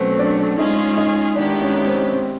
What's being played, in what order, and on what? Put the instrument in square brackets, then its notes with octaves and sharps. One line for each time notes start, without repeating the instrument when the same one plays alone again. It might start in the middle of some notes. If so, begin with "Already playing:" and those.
Already playing: [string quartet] B2 F#3 A3 [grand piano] C4 C#4 B4 C5
[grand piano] D4 D5
[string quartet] G#3 C#4 F4 G#4 [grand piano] D#4 D#5
[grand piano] D#4 D#5
[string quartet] D#3 G#3 B3 E4 G4 [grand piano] D4 D5
[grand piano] C#4 C#5
C4 C5
C4 C5